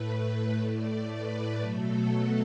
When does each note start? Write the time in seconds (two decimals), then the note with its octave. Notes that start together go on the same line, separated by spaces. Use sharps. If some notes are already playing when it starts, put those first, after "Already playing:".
Already playing: A2 A3 B4
0.60 A2 A3 D5
1.10 B4
1.59 B2 F#3 A3 A4
2.09 A4